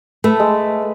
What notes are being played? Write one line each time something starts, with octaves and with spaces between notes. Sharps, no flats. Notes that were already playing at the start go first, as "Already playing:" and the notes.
A3 B4 A5 E6
G#3